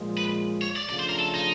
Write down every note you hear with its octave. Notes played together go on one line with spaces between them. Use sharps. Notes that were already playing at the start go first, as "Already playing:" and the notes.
Already playing: A#2 F3 G#3
B4
C#5
D5
C#3 F3 A3 D4 F4 D5
C5
A#4
A4
D#4